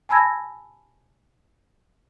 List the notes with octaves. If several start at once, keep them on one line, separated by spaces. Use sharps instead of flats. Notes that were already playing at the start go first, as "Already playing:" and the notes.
G#5 A5 B5 E6 G#6 A#6